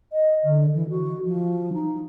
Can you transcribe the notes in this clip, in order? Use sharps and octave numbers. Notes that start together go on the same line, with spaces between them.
D#5
D3
E3
F#4
F3
D#4